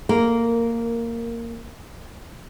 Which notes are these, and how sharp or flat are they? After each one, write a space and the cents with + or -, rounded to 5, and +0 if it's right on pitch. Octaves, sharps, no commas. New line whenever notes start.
A#3 -10 A#4 +0